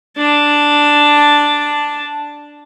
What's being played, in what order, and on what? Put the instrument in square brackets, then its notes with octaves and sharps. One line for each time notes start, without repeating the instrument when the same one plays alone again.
[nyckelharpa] D4 A5